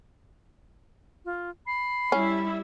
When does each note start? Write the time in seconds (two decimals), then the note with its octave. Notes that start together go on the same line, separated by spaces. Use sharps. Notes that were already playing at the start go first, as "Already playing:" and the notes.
1.25 F4
1.67 B5 C7
2.12 G3 C#4 E4 E5